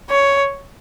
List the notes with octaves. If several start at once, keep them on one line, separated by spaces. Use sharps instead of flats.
C#5